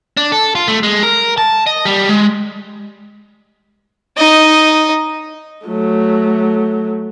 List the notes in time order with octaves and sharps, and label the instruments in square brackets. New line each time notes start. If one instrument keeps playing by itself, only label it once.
[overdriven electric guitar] D4
A4
F4
A3
G#3
A#4
A5
D#5
G3
G#3
[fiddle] D#4 D#5
[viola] F#3 A3